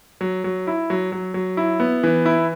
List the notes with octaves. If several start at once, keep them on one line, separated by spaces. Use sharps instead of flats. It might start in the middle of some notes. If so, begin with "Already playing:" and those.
F#3
F#3
E4
F#3
F#3
F#3
E4
B3
E3
E4